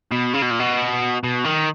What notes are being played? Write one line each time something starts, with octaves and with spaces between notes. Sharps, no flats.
B2
C#3
B2
A#2
B2
B2
D#3